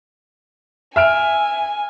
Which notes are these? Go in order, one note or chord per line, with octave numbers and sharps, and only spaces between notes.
E5 G#5 F6 D7